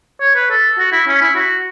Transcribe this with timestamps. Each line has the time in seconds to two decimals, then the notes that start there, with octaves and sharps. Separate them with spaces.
0.20 C#5
0.35 B4
0.50 A4
0.79 F#4
0.92 E4
1.07 C#4
1.22 E4
1.36 F#4